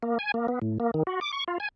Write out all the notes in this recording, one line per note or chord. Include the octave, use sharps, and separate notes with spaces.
A#3
G#5
A#3
B3
A2
A#3
D#3
F#4
D6
C#6
F4
G#5